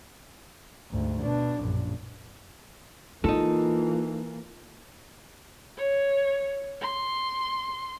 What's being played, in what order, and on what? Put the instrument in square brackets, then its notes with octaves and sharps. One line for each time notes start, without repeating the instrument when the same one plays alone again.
[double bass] D2 G#2
B2 D4
A#1 F#2
[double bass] E3 A#3 [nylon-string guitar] D#4 A4 [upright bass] F4
[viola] C#5
C6